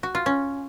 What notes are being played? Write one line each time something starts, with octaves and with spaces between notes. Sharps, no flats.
F#4
F4
C#4